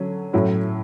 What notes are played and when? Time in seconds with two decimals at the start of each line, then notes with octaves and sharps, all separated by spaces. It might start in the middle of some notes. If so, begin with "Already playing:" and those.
Already playing: D3 F#3 C#4
0.33 A2 F#3 C#4 E4